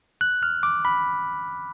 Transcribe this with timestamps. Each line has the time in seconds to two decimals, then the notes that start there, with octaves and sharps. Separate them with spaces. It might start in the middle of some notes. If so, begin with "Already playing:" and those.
0.21 F#6
0.43 F6
0.63 D6
0.85 B5